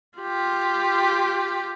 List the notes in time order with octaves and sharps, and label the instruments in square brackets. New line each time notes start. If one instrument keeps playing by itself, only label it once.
[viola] F4 G4